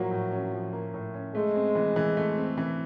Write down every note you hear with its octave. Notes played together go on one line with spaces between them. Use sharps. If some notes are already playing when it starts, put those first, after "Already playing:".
Already playing: A2 F3 F#3 A#3
A2
C#4
F3
A#3
A2
C#4
G#3 A3
C4
E3
E3
A3
C4
E3